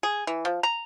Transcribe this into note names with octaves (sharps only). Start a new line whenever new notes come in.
G#4
E3
F3
A#5